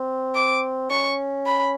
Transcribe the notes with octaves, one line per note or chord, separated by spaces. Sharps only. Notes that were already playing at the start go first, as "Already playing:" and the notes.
Already playing: C4
D6
C#4 C#6
B5